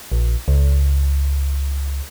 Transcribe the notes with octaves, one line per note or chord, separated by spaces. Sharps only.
A#1
C#2